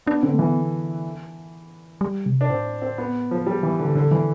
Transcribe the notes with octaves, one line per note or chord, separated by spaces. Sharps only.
B3 D4
D3 C4
A3
E3 B3
G3
C3
D4
A2 C4
C4
B3
F3
G3
E3
D3
D3
E3